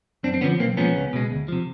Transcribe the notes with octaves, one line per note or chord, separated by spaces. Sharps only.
F#2 C4 D4
C4
D3 F3 B3 C#4
B1 A#3 C4
A#2 F3 G#3 B3 C#4
C#2
B2 G#3
D2
C3 F3